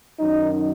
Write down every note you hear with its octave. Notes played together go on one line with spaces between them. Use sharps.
F#2 D#3 F#3 D#4